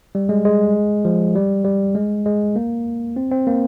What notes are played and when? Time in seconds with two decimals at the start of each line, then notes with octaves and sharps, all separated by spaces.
0.15 G3
0.29 G#3
0.45 G#3
1.05 F3
1.35 G3
1.65 G3
1.95 G#3
2.25 G#3
2.56 A#3
3.16 C4
3.31 C4
3.47 A#3